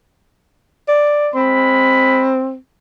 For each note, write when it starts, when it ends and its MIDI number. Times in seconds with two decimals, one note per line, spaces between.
0.88 1.29 74
1.35 2.30 56
1.35 2.56 60
1.35 2.30 83